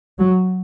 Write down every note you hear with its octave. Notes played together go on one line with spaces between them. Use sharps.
F#3